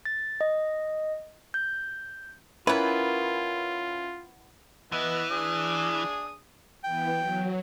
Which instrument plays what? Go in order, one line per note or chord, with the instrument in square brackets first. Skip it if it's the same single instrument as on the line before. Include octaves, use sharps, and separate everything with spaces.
[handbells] A6
D#5
G6
[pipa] E3 B3 [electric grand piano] C#4 E4 [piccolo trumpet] F4 [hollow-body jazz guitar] A#4 B4
[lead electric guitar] E3 [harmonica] B3 D#5
[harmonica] D4 G#4 D#6
[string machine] E3 B3 [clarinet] G5
[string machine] F#3